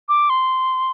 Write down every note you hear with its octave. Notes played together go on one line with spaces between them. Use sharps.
D6
C6